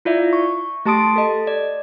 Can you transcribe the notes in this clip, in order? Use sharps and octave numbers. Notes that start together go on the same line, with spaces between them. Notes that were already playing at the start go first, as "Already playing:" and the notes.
E4 F4 D5 E5
C#6
A3 G4 A5 C6 D#6 D7
A4 D#5
D5